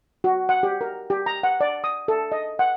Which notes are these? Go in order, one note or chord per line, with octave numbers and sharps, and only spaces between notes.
F#4
F#5
G4
A#4
G4
A#5
F#5
D5
D#6
A4
D#5
F#5